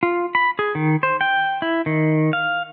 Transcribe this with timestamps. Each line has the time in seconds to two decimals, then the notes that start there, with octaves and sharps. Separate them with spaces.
0.03 F4
0.35 B5
0.59 G#4
0.75 D#3
1.03 C5
1.21 G5
1.62 E4
1.86 D#3
2.33 F5